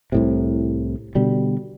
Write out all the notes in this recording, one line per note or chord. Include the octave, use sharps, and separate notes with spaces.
C2 A2 C3
B2 D3 G3